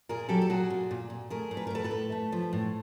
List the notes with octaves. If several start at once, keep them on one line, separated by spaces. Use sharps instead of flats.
A#2 G#4 A#4
F#3 G4 A4
A4
A#2 F#4 G#4
A#2
A#2
A#2
A3 G#4 A#4
A2
B4
A#4
A2 A4 B4
A4 B4
A2
A3
F3
A2